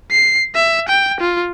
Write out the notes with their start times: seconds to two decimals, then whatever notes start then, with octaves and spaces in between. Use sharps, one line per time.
0.11 C7
0.55 E5
0.89 G5
1.20 F4